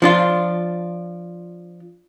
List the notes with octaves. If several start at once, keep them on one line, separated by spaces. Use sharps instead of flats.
F3 D4 F4